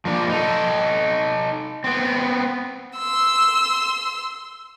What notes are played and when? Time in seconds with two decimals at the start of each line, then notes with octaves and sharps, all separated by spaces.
0.05 F3 A#3 D4
0.29 D#4 A4
1.84 B3 C4
2.98 C6 E6